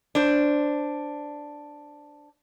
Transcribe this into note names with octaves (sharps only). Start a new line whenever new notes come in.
D4 C5